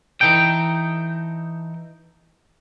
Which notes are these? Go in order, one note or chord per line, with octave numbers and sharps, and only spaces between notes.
E3 D#4 A4 G5